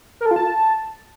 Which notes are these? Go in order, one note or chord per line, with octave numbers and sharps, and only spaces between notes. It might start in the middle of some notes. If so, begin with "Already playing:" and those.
A#4
A4
F4
A5